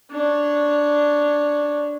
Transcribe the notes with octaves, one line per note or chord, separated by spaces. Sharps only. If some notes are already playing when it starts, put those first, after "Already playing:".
D4 C#5